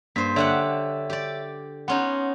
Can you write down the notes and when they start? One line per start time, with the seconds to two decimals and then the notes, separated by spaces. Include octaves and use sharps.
0.16 G2 A#3 C5 B6
0.36 D3 G4 C#5 E5 F#5 E6
1.10 G4 D5
1.88 B3 C#4 D#4 F#5 C6